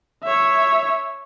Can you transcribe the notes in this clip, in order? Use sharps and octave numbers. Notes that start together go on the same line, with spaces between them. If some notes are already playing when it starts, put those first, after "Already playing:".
C#5 E5